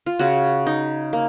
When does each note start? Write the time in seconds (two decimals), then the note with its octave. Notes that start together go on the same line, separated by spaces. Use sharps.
0.06 F4
0.19 C#3 F#4
0.67 D#4
1.13 A#3